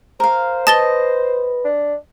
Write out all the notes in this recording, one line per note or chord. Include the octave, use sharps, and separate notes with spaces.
A#4 C5 F5
B4 D#5 A5 A6 G7
D4